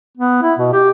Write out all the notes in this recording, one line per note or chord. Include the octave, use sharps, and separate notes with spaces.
B3
E4
B2
G4